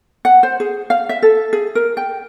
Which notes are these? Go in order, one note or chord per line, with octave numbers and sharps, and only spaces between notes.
F#5
C5
G#4
F5
E5
A4
G#4
A#4
G5